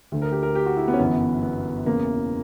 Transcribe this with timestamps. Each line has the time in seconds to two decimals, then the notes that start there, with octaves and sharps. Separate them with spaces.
0.12 D2 D3
0.22 A#4
0.32 G4
0.43 A#4
0.55 G4
0.66 F#4
0.77 E4
0.88 B3
0.93 C#4
0.99 G1 F#2 E3 B3
1.43 B3
1.86 E1 E2 C#3 E3 A#3